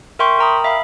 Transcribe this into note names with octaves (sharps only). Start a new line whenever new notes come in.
A#4 E5 G5 C6 C#6 G6
A#4 G5 A#5 B5 D#6
E5 F5 B5